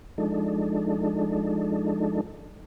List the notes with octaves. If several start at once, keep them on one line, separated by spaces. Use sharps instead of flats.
F3 G#3 D4 D#4 A4